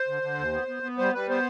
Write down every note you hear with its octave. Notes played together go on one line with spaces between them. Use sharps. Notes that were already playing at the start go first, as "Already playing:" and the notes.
Already playing: C5
D3
D3
D#2
B3
B3
B3
G3 C5
G3 B4
B3 C5